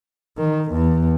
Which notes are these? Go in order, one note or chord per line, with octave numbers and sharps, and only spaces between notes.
D#3
E2